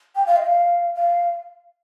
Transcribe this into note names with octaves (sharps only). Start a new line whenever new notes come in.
G5
F5
D#5
F5
F5